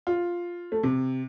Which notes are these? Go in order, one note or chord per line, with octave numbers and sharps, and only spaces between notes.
F4
A3
C3